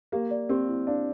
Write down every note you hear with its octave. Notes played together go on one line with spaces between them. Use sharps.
A#3 G4
D5
C4 G4
E4
D4 F5